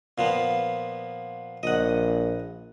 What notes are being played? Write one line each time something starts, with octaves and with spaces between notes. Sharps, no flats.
A#2 F3 B3
A#1 D#5 F#5